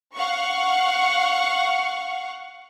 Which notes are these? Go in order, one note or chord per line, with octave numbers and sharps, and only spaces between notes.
F5 F#5 C#6